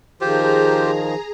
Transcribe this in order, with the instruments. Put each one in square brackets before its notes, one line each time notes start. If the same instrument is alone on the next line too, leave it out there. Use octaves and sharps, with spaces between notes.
[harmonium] D#3 F3 [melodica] F4 G4 C5 [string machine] G#4 A#5